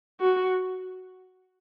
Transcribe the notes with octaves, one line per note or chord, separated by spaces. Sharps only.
F#4